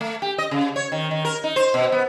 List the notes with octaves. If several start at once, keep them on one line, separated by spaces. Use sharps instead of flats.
A3
G4
D#5
C#3
C#5
D#3
D#3
A#4
D#4
C5
B2
B3